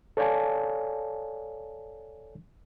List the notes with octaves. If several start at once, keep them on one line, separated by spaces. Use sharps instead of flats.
A4 C#5 D5 F5 G#5 A5